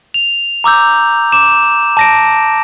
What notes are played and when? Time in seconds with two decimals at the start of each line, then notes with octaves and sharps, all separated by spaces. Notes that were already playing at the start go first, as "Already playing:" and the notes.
0.14 F7
0.64 A#5 D6 E6 G6
1.32 D6 E7
1.97 A5 A#6 D7